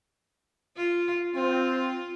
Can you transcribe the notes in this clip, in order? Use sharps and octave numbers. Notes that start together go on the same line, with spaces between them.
F4
C4 F4